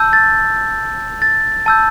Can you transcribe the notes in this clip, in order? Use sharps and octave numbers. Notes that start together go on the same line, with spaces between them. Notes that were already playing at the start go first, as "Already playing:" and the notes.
Already playing: A5 E6 G6
A6
A6
A5 E6 G6